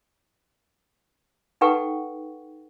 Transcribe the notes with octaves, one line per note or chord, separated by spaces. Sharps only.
D#4 A4 B4 F#5 G5 C#6